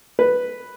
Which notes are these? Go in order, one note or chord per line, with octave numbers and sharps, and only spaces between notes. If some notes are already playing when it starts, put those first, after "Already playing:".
B4